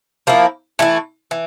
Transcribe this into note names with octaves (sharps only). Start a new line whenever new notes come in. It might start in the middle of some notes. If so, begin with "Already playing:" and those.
F3 A#3 E4
E3 A3 E4
E3